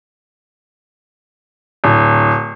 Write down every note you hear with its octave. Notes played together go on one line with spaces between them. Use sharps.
D1